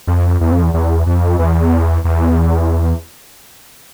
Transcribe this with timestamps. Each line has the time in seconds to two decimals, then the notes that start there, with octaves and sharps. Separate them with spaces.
0.07 F2
0.41 E2
0.52 F2
0.62 E2
0.74 E2
1.06 F2
1.39 E2
2.04 E2